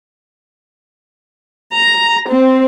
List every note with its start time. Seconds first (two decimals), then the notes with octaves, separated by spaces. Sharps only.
1.75 A#5
2.28 C4